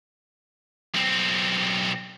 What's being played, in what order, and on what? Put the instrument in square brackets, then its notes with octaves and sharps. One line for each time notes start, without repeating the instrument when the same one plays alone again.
[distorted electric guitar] B1 C4